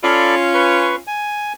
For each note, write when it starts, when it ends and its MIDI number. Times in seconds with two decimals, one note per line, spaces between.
0.03 0.98 61
0.03 0.98 65
0.03 0.35 69
0.03 0.35 74
0.03 0.35 83
0.54 0.96 71
0.54 0.96 85
1.07 1.53 80